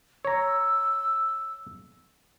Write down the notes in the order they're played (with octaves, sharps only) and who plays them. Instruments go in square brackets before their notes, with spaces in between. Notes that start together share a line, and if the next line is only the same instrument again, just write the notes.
[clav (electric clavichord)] C#5 A#5 [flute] E6